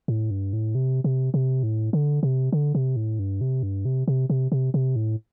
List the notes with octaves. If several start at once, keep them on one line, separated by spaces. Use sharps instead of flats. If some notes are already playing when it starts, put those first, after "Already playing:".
A2
G2
A2
C3
C3
C3
A2
D3
C3
D3
C3
A2
G2
C3
G2
C3
C3
C3
C3
C3
A2